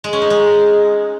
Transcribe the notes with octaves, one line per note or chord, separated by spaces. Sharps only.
G#3
C#4
D#4
G#3